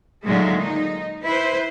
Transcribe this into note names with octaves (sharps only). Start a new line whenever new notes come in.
A#2 D3 D#3 F#3 G#3 A3
D#4
E4 B4 C5